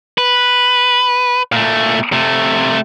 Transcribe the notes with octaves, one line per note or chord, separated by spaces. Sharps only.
B4
A#2 A3
C3 A3